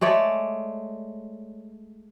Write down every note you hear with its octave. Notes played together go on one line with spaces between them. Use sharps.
G#3 A3 C#5 D5